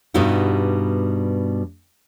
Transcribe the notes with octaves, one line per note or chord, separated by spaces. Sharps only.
G2 B2 G3 B3 D#4 E4